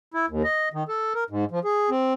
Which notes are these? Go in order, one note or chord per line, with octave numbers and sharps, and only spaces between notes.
E4
D#2
D#5
D#3
A4
A#4
G#2
F3
G#4
C4